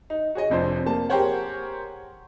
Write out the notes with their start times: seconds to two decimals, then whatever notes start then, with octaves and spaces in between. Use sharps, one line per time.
0.10 D#4
0.35 F#4 G#4 C#5 D#5
0.50 F1 F2 D4 C5
0.86 A#3 A5
1.09 G4 G#4 A#4 C5 C#5 F#5